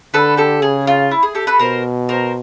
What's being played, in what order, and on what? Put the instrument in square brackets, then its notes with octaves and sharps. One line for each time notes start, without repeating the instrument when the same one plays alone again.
[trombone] D3 [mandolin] A4 B4
[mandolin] G4 A4
[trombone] C#3 [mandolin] G#4
[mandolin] F4
E4
G#4
G4 A4
A4 B4
[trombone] B2 [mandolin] A#4 C5
[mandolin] A#4 C5